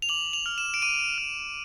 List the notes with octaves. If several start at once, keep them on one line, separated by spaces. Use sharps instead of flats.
F7
D6 F#7
F7
F6
E7
D7
D6 D#7
F6